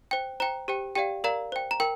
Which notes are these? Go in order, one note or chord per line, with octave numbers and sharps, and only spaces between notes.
C5 G5
C5 G5 A#5
G4 C5 G5
G4 D5 F5 G5
A#4 D5 F5 A#5
C5 G5
A#5
A#4 G5